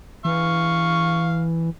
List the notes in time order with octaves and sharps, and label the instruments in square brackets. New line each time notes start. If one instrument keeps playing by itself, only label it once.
[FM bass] E3 [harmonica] F5 C#6